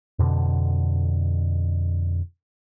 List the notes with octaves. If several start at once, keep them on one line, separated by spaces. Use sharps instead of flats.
F2 B2 D3